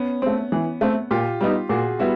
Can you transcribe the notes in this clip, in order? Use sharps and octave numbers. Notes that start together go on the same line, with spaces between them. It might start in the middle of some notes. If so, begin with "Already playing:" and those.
Already playing: B3 C#4
A3 C4
E3
A3 C4
A#2 F4 G4
G3 B3 D#4
A#2 F#4 G#4
G3 B3 E4 F#4